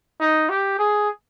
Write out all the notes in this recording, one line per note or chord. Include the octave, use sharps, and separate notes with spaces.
D#4
G4
G#4